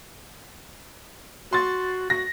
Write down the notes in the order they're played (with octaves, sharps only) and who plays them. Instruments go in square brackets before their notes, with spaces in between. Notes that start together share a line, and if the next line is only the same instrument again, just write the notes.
[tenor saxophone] F#4 [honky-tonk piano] C6 A6
[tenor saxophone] F#4 [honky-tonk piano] A#6